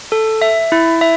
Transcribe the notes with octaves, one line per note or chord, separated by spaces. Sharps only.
A4
E5
E4
E5